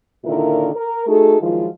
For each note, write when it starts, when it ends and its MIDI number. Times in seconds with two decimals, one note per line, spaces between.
0.24 0.69 46
0.24 0.69 50
0.24 0.69 51
0.24 0.69 64
0.24 0.69 65
0.24 0.69 70
0.75 1.03 70
1.07 1.40 57
1.07 1.40 63
1.07 1.40 66
1.07 1.40 68
1.07 1.40 69
1.40 1.67 51
1.40 1.67 53
1.40 1.67 54
1.40 1.67 56
1.40 1.67 64
1.40 1.67 65